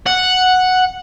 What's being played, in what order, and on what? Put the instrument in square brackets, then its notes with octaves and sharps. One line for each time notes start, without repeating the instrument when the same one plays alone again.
[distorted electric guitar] F#5